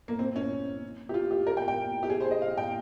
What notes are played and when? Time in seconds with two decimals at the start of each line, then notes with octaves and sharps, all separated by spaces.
0.08 A#3
0.19 C4
0.36 C#4
1.09 G4
1.14 F4
1.31 G4
1.47 A#4
1.57 G5
1.68 G5
2.03 G4
2.10 G#4
2.20 C5
2.31 D#5
2.42 F5
2.58 G5